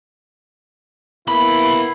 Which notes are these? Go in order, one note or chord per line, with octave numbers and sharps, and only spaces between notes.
C2 A#3 B3 E4 B5